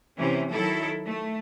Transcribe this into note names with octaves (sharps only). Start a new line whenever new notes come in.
C3 E3 C#4
D#3 F#3 E4 A4
A3